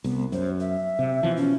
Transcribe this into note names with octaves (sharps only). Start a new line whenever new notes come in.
C2 B3
F#2 C5
E5
C3
B2 E3 F3
C#4